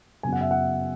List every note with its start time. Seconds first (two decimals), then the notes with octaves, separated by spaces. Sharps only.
0.23 F#2 C#3 F#3 B3 G#5
0.33 F#5
0.41 E5
0.51 F#5